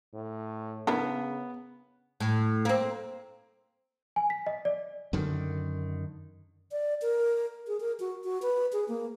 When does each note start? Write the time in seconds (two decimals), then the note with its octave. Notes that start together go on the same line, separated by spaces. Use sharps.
0.14 A2
0.87 C#3 B3 D4 E4 A#4
2.20 A2
2.65 A#3 C4
4.16 G#5
4.30 B6
4.47 D#5
4.65 D5
5.13 F#2 D3 D#3
6.72 D5
7.02 A#4
7.67 G#4
7.80 A#4
8.00 F#4
8.24 F#4
8.42 B4
8.73 G#4
8.88 A#3